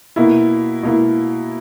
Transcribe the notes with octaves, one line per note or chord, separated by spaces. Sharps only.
B2 A#3 E4
B2 A#3 E4